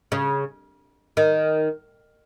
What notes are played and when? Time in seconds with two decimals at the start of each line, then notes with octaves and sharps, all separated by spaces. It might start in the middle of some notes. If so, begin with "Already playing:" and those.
0.12 C#3
1.17 D#3